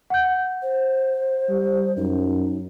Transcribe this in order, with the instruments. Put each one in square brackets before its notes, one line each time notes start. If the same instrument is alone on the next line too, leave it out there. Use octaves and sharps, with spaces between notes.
[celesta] F#5 G6
[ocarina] C5
[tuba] G3
[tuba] F#2 [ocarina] D#4